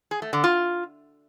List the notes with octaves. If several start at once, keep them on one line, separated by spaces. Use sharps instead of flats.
G#4
A3
D3
F4